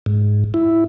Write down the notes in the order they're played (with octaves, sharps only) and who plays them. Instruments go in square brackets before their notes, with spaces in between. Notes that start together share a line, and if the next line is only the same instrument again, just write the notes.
[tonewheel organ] G#2
E4